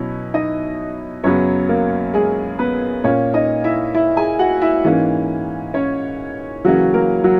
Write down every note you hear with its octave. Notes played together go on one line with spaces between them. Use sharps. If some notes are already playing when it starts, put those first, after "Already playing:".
Already playing: B2 F#3 C#4 E4
D#4 D#5
F#2 C#3 F#3 B3 C#4 C#5
A#3 A#4
G#3 G#4
B3 B4
A#2 A#3 C#4 C#5
D#4 D#5
E4 E5
E4 E5
G#4 G#5
F#4 F#5
E4 E5
G#2 E3 A#3 C#4
C#4 C#5
C#3 E3 F#3 A#3 C#4 F#4
A#3 A#4
F#3 F#4